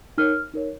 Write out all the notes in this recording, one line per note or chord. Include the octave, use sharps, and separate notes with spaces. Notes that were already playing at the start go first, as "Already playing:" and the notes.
D#4 A#4 C#5 F6
D#4 A#4 C#5